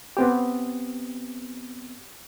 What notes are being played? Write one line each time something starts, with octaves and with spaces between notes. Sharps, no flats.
B3 C4 G4